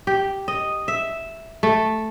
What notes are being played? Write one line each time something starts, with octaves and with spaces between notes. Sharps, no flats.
G4
D#5
E5
A3